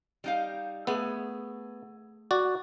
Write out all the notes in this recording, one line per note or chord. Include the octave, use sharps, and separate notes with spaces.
G3 D#4 F5
A3 B3 G#4
F#4 D5